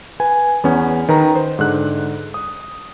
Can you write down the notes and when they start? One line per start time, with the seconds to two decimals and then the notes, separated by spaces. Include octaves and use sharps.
0.20 B4 G#5
0.64 E2 B3 C#4
1.09 D#3 B4 A#5
1.36 C5
1.59 G#2 D3 F#6
2.34 D#6